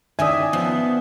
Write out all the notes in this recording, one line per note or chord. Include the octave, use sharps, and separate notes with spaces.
D#3 C#4 D5 E5 G#5 D#6
F3 B3